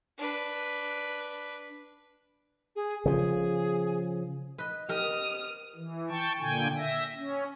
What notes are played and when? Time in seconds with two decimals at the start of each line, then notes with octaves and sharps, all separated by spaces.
0.18 D4 B4
2.76 G#4
3.06 C#3 F3 G#4
4.58 B4 D#5
4.89 G4 A#4 D#5 D#6 F6
5.75 E3
6.10 G5 A5 C#6
6.40 A#2 D3 G5 G#5
6.78 E5 A#6
7.17 C#4